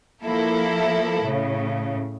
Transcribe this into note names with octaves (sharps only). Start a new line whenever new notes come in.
F3 A#3 E4 A4
A2 C#3